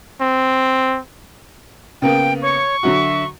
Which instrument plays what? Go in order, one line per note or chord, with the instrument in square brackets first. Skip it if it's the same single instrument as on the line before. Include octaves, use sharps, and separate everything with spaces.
[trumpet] C4
[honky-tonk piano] C#3 A#3 B3 [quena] G5
[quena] C#5 [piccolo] C#6
[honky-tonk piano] D3 F#3 F#4 [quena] E5